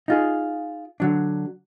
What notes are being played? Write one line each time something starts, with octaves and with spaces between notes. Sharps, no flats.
D#4 F4 G#4
D3 F#3 D4